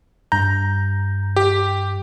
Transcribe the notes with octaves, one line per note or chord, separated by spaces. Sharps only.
G2 A#5 G6
G4